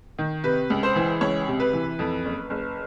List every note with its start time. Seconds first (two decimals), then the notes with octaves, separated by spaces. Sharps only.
0.18 D#3
0.44 C3 B4
0.70 C#2
0.83 C5
0.96 E3
1.21 C#2 C#5
1.48 C3
1.60 B4
1.73 E3
1.99 F2
2.25 F#1
2.50 F#1